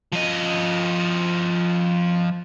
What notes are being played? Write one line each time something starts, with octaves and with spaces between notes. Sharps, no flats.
F3 D#5